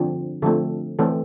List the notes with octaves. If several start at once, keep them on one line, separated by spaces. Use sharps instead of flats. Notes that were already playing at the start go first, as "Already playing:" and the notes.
Already playing: D3 F3 C4
D3 F3 A3 C4 A4
E3 A3 C4 A4